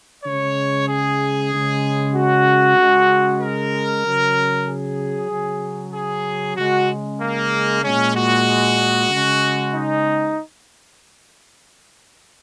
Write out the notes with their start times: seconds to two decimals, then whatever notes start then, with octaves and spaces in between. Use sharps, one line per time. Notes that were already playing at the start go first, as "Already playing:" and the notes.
0.24 C#3 G#3 C#5
0.88 G#4
1.51 C#3 G#3
2.14 F#4
2.77 C#3 G#3
3.41 A#4
4.04 C#3 F#3
4.67 G#4
5.31 C#3 F#3
5.93 G#4
6.57 C#3 G#3 F#4
7.20 A#3
7.83 A#2 G#3 C#4
8.16 F#4
9.10 C#3 G#3
9.74 D#4